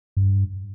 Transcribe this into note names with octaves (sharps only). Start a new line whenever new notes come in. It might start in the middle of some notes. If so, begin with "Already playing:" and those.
G2